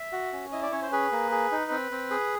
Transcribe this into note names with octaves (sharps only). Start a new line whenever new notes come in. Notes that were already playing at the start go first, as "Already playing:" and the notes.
Already playing: E5
F#4
C#4
E4 D#5
D5
C#4 C#5
C5
G#4 B4
A#3
G#4
D#4
C4
C4
G#4